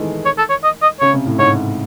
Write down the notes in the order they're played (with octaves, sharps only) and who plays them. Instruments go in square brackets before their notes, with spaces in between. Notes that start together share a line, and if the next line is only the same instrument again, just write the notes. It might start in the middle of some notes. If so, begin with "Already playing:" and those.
Already playing: [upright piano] D#3 E3 G#3 A3
[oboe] C#5
A4
C#5
D#5
D#5
[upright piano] C#3 [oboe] C#5
[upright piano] C3
A2
[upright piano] G#2 [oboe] C#5